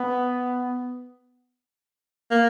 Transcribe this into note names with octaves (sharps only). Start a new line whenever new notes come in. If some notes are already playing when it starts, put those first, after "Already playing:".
Already playing: B3
A#3